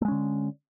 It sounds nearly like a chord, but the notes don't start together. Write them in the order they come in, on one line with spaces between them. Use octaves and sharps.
A3 G#3 C#4 D3